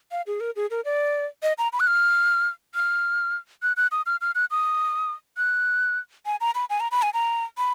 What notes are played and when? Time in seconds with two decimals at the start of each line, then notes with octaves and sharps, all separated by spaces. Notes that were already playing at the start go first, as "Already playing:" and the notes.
0.11 F5
0.27 G#4
0.40 A#4
0.56 G#4
0.70 A#4
0.85 D5
1.43 D#5
1.58 A#5
1.73 B5
1.80 F#6
1.87 F6
2.75 F6
3.63 F#6
3.77 F#6
3.92 D#6
4.06 F6
4.21 F6
4.35 F#6
4.51 D#6
5.37 F#6
6.26 G#5
6.41 A#5
6.55 B5
6.70 G#5
6.80 A#5
6.91 B5
7.02 G#5
7.14 A#5
7.58 B5